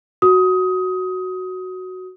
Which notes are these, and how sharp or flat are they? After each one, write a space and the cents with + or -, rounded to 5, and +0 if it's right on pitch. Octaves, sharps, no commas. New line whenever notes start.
F#4 +0 D#6 +20